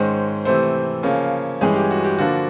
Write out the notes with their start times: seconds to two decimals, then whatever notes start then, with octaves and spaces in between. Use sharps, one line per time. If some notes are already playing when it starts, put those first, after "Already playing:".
Already playing: G#2 D#3 G#3 C#4 C5
0.45 C3 E3 A3 C4 C5
1.03 C#3 F3 A#3 C#4
1.61 G2 E3 G#3 C#4 G#4
1.76 G4
1.91 F#4
2.04 G4
2.18 D3 F3 A#3 D4 F#4